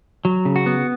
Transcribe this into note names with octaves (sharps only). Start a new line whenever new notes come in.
F#3
C#3
F#4
B3